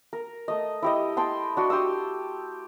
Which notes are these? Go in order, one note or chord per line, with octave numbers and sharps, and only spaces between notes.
A#4
A3 D#5
E4 G4 D#5
G5 A5 C6
D4 F#4
G4 C6 D#6 E6